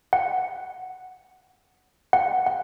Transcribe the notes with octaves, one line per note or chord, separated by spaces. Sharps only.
F#5
F#5
F#5